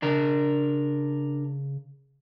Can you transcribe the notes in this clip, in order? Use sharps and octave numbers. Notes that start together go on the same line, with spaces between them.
C#3 D4 A#4